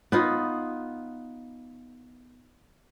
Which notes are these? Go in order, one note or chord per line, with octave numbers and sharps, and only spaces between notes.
B3 D#4 F4